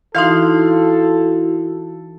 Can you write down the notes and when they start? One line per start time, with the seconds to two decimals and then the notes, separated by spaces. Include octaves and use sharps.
0.15 E3 D#4 E4 F#4 A4 F5 C6